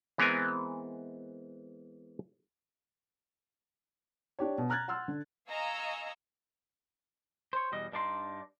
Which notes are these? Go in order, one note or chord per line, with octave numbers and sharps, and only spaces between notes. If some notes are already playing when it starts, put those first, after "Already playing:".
E3 G#3 B3 C4 A#4 G#5
D4 G4 C#5
B2
A#5 F6 F#6 G#6 A6
F#5 C6 E6 F6
D3
D#5 F5 G#5 A#5 C#6 E6
C5 C#5
E2 B2 G3 D#5
G2 D4 D#4 D5 C6